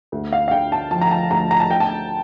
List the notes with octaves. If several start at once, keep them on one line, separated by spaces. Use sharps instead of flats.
D2
F5
F5
D3 G5
A5
F3 A5
A#5
A5
D2 A#5
A#5
A5
D2 G5
A5